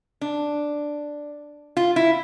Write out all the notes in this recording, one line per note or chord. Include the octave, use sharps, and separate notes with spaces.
D4
F4
E4